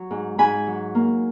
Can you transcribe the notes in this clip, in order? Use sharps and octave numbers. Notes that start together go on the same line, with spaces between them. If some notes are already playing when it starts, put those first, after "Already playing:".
Already playing: F#3
G#2
G#2 G#5 B5
F#3
A#3